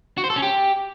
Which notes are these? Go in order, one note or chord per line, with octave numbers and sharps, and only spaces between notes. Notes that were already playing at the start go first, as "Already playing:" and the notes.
F#4
C5
A4
C#4
G4